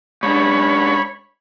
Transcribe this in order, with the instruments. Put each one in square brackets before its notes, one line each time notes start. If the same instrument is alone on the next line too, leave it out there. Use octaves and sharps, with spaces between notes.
[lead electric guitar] G#2 D4 [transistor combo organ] C#5 B5